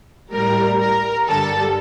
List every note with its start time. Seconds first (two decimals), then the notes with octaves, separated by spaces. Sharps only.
0.33 A2 G3 A#4
0.80 A#4
1.27 G2 D3 G3 A4